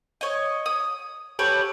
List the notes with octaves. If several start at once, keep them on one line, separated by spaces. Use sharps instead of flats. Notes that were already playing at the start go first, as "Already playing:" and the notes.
C#5 D#5
D#6
G4 A4 B4 C#5